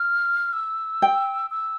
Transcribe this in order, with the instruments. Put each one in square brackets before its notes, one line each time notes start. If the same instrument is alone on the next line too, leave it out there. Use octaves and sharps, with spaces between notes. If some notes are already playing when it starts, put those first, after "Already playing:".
Already playing: [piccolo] F6
E6
[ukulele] G5
[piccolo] E6